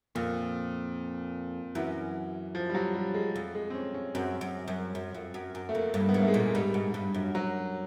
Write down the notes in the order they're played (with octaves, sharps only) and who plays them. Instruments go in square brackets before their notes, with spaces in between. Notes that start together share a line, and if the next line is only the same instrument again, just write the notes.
[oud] F2 [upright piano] A#2
[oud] F#2 [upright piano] E3
[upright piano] F3
G3
F#3
G3
G#3
[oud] F2
[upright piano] G#3
C4
C#4
C#4
[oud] F#2 [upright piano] C4
[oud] F#2
F#2
F#2
F2
F#2
F#2
[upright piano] A3
[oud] F2 [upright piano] A#3
[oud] G2
[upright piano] A#3
B3
[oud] G#2 [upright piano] A#3
[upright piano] A3
G#3
[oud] A#2
[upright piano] G#3
[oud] G#2 [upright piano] G3
[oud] G#2
G2
F#2
[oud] F#2 [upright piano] F#3